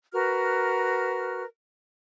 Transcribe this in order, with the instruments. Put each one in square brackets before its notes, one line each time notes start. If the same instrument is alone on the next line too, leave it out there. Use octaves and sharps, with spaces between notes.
[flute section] F#4 A#4 B4 F6